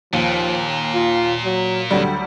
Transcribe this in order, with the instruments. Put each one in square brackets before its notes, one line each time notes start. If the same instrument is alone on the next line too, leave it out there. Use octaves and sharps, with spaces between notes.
[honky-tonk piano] D#2 [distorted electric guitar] A#2 [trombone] F3
[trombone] F4
F#3
[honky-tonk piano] D2 F#3 G3 [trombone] D3